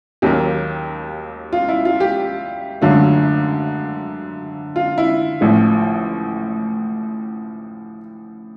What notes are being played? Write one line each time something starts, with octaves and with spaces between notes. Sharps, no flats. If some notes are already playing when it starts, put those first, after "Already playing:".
D#2 D#3 F#3 A#3 G4
F4
E4
F4
G4
G#1 F#2 D3 F#3 A3 F4
F4
E4
A1 A2 F3